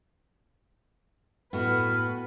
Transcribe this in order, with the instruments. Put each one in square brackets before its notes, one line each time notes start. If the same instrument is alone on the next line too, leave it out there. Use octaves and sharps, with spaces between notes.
[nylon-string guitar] A2 [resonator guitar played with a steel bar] B3 F#4 [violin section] B4 [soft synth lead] F6